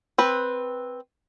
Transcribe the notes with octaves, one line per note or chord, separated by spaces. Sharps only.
C4 B4